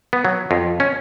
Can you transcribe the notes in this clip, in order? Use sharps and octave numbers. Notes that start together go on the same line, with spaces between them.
B3
F#3
F2
C#4